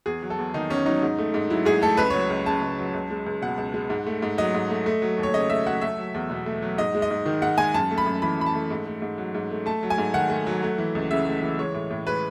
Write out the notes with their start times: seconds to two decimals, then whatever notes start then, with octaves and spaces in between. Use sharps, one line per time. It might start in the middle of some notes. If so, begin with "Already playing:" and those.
0.06 E2 G#4
0.22 F#3
0.30 A4
0.38 E2
0.54 D#3 D#4
0.70 E2 C#4
0.86 F#3 D#4
1.02 G#2
1.19 A3
1.34 G#2
1.50 F#3 E4
1.65 G#2 G#4
1.82 A3 A4
1.97 C#2 B4
2.10 C#5
2.14 F#3
2.30 C#2
2.46 C#3 A5
2.61 C#2
2.79 F#3
2.94 C#2
3.10 G#3
3.26 C#2
3.42 B2 F#5
3.58 C#2
3.74 G#3
3.90 G#2
4.06 A3
4.22 G#2
4.38 F#3 D#5
4.54 G#2
4.70 A3
4.86 A3
5.02 F#3
5.18 D#2
5.23 C#5
5.34 C#3 D#5
5.50 A3 E5
5.66 F#3 F#5
5.82 A3 E5
5.98 F#3
6.14 E2
6.30 B2
6.46 A3
6.62 F#3
6.78 G#2 D#5
6.95 G#3
7.02 D#5
7.10 G#2
7.26 D#3
7.42 G#2 F#5
7.58 G#3 G#5
7.74 F#2 A5
7.91 A3
7.98 B5
8.06 F#2
8.22 E3 B5
8.38 F#2 B5
8.46 A5
8.55 A3
8.70 G#2
8.86 A3
9.02 G#2
9.18 F#3
9.35 G#2
9.51 A3
9.66 A3 A5
9.83 F#3
9.90 G#5
9.98 G#2
10.14 D#3 F#5
10.30 A3
10.47 F#3
10.63 A3
10.78 E3
10.95 C#2
11.11 C#3 E5
11.27 A3
11.42 E3
11.58 G#3 C#5
11.74 A2
11.91 A2
12.06 G#3 B4